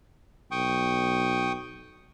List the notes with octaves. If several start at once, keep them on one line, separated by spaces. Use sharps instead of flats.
B1 G5 C#6 D#6